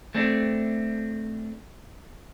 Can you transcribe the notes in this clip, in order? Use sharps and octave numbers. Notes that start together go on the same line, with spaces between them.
A3 C4 D4